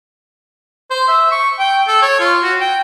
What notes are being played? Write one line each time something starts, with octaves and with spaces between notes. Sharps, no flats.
C5
E5
C#6
G5
A4
C#5
F4
F#4
G5